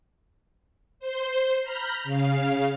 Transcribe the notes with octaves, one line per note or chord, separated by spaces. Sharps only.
C5 C6
A#5 B5 F6 G6
C#3 F5